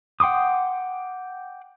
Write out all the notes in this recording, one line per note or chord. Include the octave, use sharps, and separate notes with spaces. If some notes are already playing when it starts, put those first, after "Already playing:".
F#5 G5 C6 D6 D#6